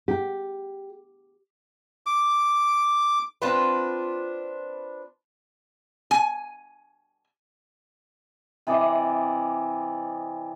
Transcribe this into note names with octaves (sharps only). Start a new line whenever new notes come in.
G4
D6
C4 D4 F4 B4
G#5
C3 E3 D5 D#5